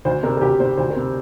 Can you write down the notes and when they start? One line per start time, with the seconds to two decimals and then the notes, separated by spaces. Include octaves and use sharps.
0.05 D2 C5
0.23 C3 A#4
0.37 A#4
0.41 D2 G4
0.60 C3 C5
0.77 D2 C5
0.90 A#4
0.96 C3